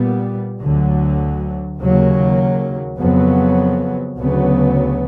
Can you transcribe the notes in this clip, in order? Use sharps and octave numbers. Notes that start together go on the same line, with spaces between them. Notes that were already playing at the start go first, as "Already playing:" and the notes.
Already playing: A#2 G3 B3
D2 D3 F#3
D#2 C#3 F#3 A#3
F2 C#3 F#3 B3
D2 C#3 F#3 B3